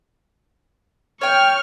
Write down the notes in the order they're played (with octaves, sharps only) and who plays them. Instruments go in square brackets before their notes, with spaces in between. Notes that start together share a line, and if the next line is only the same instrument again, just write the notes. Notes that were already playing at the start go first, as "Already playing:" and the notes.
[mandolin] C#5 G5 [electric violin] C#6 F6